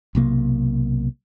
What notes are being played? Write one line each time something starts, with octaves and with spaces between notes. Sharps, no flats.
B1 C3 A#3